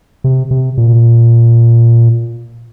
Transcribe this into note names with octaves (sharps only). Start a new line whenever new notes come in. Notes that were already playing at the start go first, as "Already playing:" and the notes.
C3
C3
A#2